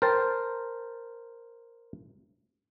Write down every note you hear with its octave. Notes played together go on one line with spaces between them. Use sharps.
A#4 C5 G5 A5